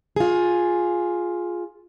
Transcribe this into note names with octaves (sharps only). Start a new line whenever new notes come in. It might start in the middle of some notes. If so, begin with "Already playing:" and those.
F4 G#4